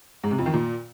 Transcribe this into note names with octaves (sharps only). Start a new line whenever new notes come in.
G#2
C3
F2
D#3
A#2